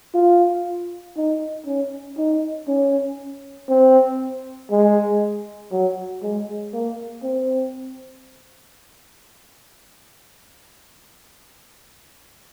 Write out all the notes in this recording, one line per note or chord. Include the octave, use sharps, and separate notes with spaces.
F4
D#4
C#4
D#4
C#4
C4
G#3
F#3
G#3
A#3
C4